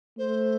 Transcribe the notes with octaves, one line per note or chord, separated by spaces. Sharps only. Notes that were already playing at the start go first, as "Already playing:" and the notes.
A3 C5